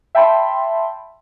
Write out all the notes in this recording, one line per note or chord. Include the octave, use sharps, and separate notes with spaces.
E5 G5 A5 B5 C6